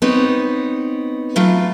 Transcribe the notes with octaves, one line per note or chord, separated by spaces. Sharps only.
B3 C4 D#4 C#5
E3 F#3 A3 F4